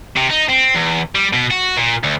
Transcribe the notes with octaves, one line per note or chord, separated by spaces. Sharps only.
C3
D#4
C4
E2
G3
B2
F#4
A#2
D2